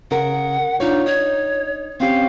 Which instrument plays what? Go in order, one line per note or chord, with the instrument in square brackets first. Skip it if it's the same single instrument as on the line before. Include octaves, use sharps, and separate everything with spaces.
[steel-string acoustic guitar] C#3 A#4 [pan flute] F#5
[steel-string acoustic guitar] D4 F4 C#5 [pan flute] D#4
[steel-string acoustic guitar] D#4 [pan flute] C#5
[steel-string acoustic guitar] C4 C#4 G4 [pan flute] F5